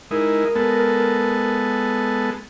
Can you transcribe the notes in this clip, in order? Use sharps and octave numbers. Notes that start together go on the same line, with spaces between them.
G#3 D#4 E4 A#4
G#3 B3 A4